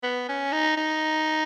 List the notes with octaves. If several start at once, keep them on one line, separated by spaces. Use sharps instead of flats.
B3
C#4
D#4
D#4